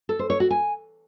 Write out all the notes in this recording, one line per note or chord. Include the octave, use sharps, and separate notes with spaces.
A4
C5
C#5
F#4
G#5